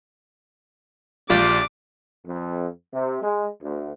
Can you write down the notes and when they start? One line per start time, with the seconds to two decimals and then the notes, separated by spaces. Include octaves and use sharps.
1.30 A#1 F4 G4 D5 G5 D6
2.26 F2
2.93 C3
3.23 G#3
3.63 D2